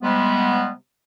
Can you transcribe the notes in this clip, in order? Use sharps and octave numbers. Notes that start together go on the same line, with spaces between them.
C3 G3 G#3 B3